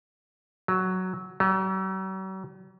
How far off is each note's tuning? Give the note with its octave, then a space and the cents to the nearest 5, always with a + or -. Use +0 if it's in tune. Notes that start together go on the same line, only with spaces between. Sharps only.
F#3 +5
F#3 +45